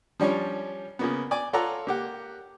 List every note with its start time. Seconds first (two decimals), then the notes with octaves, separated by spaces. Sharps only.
0.20 F3 G3 C#4 D4 C#5
0.99 C#3 A#3 B3
1.31 D5 G#5 D6
1.53 F4 A4 C#5 D5 F#5 A#5
1.87 A#3 G4 F#5